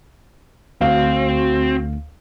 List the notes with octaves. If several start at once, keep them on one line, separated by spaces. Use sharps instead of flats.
D2 C4 F#4 F5